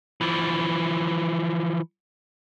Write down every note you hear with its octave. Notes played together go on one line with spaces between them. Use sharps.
E3 F3